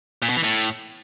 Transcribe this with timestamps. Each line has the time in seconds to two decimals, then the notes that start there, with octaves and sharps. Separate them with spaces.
0.22 A#2
0.29 B2
0.36 E3
0.43 A2